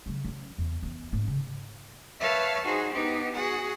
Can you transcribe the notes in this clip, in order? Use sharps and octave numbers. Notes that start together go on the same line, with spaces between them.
C#3 F#3
F#3 C#4
E2
E3 B3
G#2 A#3
C#3
B4 C#5 E5 F5 A5
D#4 F#4 G#4 C5
B3 D#4 G4
F#4 G#4 F#5